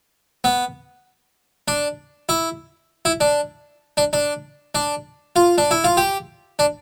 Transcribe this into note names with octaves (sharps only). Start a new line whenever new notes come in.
B3
D4
E4
E4
D4
D4
D4
D4
F4
D4
E4
F4
G4
D4